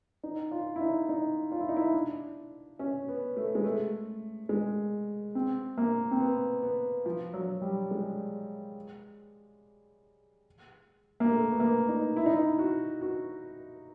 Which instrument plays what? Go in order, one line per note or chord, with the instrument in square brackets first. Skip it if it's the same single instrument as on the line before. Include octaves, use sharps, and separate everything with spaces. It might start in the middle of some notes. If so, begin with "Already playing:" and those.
[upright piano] D#4
F4
E4
D#4
D#4
F4
E4
D#4
E4
D4
C#4
B3
A3
G#3
A3
G#3
C4
A#3
C4
B3
B3
F3
F#3
G3
G#3
A#3
A3
B3
A#3
D#4
E4
D#4
E4
F#4
F#4